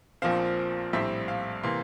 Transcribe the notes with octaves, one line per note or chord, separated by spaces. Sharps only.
A#1 A#2 F3 C4 F5
A#1 A2 G3 C4 E5
F5
C3 E3 A#3 C6